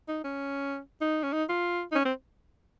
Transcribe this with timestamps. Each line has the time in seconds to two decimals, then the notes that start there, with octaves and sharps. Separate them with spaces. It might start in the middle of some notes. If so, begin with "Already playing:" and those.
0.08 D#4
0.24 C#4
1.01 D#4
1.23 C#4
1.33 D#4
1.49 F4
1.92 D#4
1.95 C#4
2.05 C4